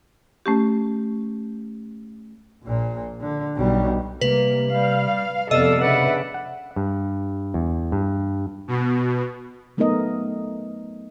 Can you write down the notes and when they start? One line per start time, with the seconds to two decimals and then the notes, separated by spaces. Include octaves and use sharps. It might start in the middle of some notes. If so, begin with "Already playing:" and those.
0.46 A3 C#4 G4
2.64 A#1 A#2
3.20 D3
3.56 B1 G3
4.21 C3 G3 A#3 B4
4.73 G3 F5
5.51 F2 C3 B3 A4 D5 D#5 F5 E6
5.81 C#3 D4 B4 D5 E5 F#5
6.34 F#5
6.76 G2
7.54 E2
7.92 G2
8.68 B2
9.77 F#3 A3 B3 D#4 A#4 D#5